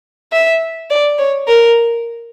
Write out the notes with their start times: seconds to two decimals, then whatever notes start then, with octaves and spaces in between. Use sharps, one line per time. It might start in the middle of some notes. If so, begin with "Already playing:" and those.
0.32 E5
0.90 D5
1.18 C#5
1.48 A#4